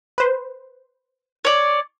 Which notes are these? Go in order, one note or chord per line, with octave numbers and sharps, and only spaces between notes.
B4 C5
C#5 D5